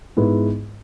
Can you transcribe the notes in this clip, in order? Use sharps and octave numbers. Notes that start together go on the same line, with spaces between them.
G#2 G#3 B3 E4